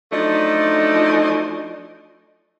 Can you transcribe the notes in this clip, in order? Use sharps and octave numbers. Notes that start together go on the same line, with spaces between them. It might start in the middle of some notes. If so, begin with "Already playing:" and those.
F3 F#3 A3 D4 D#4